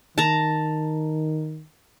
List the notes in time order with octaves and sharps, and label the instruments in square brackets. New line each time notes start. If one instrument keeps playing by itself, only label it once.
[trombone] D#3 [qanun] A5 A#5